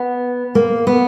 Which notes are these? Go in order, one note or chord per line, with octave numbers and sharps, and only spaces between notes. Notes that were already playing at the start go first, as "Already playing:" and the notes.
Already playing: B3
A#3
B3